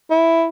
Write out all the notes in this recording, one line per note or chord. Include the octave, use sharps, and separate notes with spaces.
E4